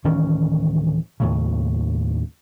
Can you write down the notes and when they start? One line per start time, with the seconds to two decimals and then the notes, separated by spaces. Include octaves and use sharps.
0.04 D1 D#3 E3 C#4
1.20 D#2 A2 C#3